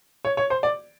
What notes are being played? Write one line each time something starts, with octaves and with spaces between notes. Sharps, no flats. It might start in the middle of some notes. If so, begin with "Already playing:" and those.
C#5
C#5
C5
D5